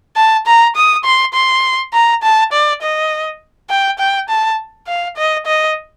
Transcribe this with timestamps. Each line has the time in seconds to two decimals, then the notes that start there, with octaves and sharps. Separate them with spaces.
0.16 A5
0.47 A#5
0.76 D#6
1.04 C6
1.34 C6
1.93 A#5
2.23 A5
2.52 D5
2.82 D#5
3.70 G5
3.99 G5
4.29 A5
4.87 F5
5.17 D#5
5.46 D#5